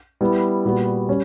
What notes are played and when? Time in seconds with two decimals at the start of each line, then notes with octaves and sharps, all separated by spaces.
0.21 G3 B3 E4
0.65 A#2 G3 B3 F#4
1.09 G3 C#4